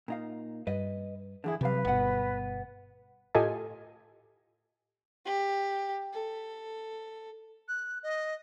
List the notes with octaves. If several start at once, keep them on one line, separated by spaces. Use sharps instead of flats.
A#2 D#4 F5
G2 B4 D#5
D3 E3 E4 G#4
E2 C3 F#3 G3 B4 F5
G1 B2 B3 F#5
A2 F4 G4 A4 D#5 G#5
G4
A4
F#6
D#5